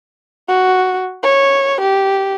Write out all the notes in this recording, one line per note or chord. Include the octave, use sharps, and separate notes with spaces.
F#4
C#5
G4